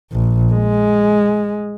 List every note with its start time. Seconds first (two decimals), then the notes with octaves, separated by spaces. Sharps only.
0.12 A#1
0.53 G#3